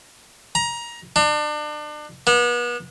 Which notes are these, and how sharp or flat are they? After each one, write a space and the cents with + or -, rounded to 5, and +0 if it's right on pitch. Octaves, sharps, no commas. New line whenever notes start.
A#5 +20
D4 +35
B3 -35